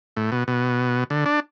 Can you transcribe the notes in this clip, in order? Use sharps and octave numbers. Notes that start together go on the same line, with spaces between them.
A2
B2
B2
D3
D4